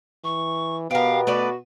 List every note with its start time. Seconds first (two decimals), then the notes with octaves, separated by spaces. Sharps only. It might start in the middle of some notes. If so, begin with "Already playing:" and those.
0.24 E3 C#6
0.91 B2 B3 G4 A#4 F5
1.27 A3 F#4 B4 D5